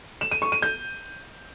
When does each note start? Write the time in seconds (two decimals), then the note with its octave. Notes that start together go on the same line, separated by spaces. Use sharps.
0.21 E7
0.31 D#7
0.42 C#6
0.52 D#7
0.62 G6